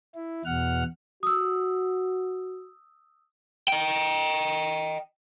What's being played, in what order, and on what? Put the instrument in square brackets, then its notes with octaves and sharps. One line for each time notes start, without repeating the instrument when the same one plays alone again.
[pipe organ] E4
E2 B2 F#5 F6
[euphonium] F#4 [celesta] D#6 E6
[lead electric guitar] D#5 G5